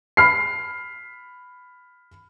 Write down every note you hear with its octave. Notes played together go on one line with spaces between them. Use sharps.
B5 F6 C7